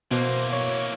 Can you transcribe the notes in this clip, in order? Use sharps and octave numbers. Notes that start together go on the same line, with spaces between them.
B2 E3 A#3 C5
C#5